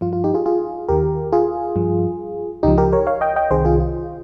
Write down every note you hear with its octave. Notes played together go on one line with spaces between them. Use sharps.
G2 F3 F4
F4
D#4 G4
F4 G#4
F4 G#4
D#2 D#3 G4 A#4
F4 G#4
G2 F3
C#2 C#3 F3 D#4 G4
G4 A#4
A#4 C#5
C#5 F5
D#5 G5
D#5 G5
C2 C3 D#3 G#4 C5
F4 G#4
F4